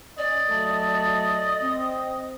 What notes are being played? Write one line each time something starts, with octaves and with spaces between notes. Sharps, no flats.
C#4 D5 D#5
F#3 A3 A4
C4